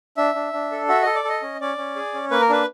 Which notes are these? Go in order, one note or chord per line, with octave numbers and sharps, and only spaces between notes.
D4 E5
D4
D4
A4
F#4 E5
A4 D#5
D5
A4 D#5
C#4
C#4 D5
C#4
G#4
C#4
A#3 B4
A#4
D4 B4